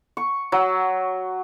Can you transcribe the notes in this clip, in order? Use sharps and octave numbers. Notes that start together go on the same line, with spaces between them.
C#6
F#3